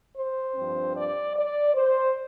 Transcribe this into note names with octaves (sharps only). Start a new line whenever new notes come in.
C5
G2 F3 C4
D5
D5
C5